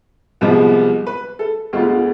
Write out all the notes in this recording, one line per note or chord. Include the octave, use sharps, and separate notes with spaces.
C2 C3 F3 G#3 B3
B4
A4
D2 D3 G#3 B3 F4
F4